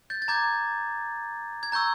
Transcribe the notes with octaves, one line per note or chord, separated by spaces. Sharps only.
G6 A6
A6
A#5 D6 G6 G#6
G#6
A#5 C#6 E6 G6